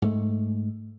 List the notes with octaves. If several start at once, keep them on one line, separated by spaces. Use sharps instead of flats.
G#2 A3